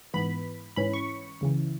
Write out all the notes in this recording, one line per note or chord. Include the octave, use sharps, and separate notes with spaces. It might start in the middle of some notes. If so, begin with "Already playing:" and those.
G#2 E3 B3 B5
G#2 E3 C#4 B5
C#6
C#2 C#3 E3